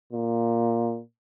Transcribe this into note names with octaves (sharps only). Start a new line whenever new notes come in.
A#2